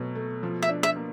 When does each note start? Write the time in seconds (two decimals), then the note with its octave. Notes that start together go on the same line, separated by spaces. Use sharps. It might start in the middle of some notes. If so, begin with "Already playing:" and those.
Already playing: B2 F#3 A3
0.15 A3
0.43 F3
0.62 E5
0.69 D4
0.83 E5
0.96 A#3